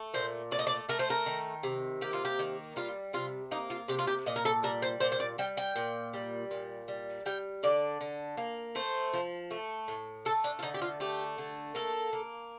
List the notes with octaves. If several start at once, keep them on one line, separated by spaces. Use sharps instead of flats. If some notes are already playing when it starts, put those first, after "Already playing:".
Already playing: A3
A#2 C5
A3 D5
D#5
D5
A3 A#4
C5
A#4
D#3
C3
A#3 G4
F4
G4
D#3
G3 F4
C3 F4
A#3 D#4
F4
C3 G4
F4
G4
A#2 D#5
A#4
A4
G3 A#4
C5
A#2 C5
C5
D5
G3 G5
G5
A#2
G3
A#2
G3
G3 G5
D3 D5
D3
A#3
A3 C5
F3
A3
A2
A3 A4
D4
F4
D3 D#4
G4
F4
A3 G4
D3
A#3 A4
A#3